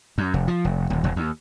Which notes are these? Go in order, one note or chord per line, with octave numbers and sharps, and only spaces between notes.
F#2
F1
F3
F1
D#1
E1
D#2